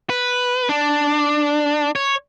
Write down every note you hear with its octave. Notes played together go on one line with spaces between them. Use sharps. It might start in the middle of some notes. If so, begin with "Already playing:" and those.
B4
D4
C#5